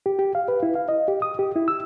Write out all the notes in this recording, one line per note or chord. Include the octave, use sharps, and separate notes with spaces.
G4
G4
F5
B4
E4
F5
D#5
G4
D#6
G4
E4
E6